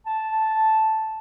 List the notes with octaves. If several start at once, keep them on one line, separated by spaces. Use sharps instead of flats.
A5